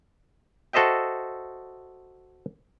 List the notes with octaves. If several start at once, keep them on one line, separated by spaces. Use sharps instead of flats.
F#4 A4 C5 D#5 E5 G5